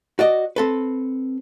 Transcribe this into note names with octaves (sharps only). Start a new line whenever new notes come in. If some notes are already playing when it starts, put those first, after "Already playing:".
F#4 D5 D#5
C4 A4 B4